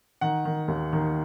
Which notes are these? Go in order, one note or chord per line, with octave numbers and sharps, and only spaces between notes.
D#3 F#5
D#3
D#2
D#3